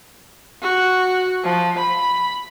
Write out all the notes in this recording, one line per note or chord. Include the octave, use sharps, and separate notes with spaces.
F#4
F3
B5